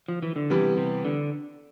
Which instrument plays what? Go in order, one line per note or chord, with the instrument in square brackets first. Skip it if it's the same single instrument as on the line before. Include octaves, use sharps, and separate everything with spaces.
[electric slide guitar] F3
E3
D3
[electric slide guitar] C3 [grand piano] E3 G3 B3
[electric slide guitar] C3
D3